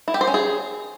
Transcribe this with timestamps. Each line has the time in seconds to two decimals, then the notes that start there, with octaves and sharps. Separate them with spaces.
0.08 E4
0.14 G4
0.21 C5
0.27 C#4
0.34 G#4